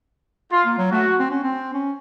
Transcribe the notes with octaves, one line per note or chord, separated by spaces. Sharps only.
F4
A#3
F#3
A3 F#4
C4
C#4
C4
C#4